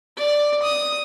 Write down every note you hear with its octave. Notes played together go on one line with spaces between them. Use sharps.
D5
D#6